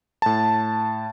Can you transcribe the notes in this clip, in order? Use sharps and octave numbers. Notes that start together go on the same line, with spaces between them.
A2 A5